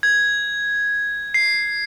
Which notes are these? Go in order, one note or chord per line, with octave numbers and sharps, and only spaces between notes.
G#6
C7